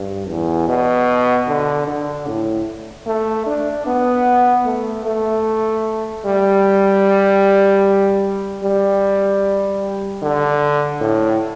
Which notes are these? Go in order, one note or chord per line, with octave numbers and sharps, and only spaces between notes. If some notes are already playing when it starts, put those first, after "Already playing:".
Already playing: G2
E2
B2
D3
D3
A2
A3
D4
B3
A3
A3
G3
G3
D3
A2